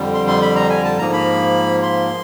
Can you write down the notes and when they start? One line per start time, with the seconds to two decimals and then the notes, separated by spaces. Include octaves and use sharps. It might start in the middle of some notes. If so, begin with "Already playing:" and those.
Already playing: F2 D3 G3
0.14 C6
0.27 C6
0.42 B5
0.56 A#5
0.70 G#5
0.84 A5
0.98 G#2 F3 A#3 A#5
1.13 B5
1.83 C6